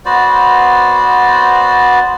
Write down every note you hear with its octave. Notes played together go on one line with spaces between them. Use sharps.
B3 F#4 C5 D5